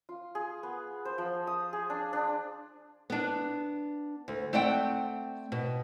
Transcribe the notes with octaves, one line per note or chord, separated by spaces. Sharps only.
F4
G#4
B3
C5
F3
D#6
G#4
D4
D4
B3 D4
D2
A3 C4 D5 F#5 G5
B2